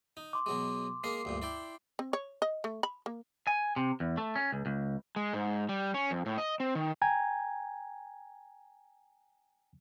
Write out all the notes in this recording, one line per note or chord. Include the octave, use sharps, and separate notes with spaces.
D#4
C6 D6
B2 F#3 G#3
G#3 A#3 A#4 C7
D2 G2 A#2
E4 D5 G5
C4
C#5
D#5
A3
B5
A#3
G#5
C3
E2
A3
C#4
C#2
C#2
G#3
G#2
G3
C#4
F2
A2
D#5
C4
D#3
G5 G#5 A#5 G#6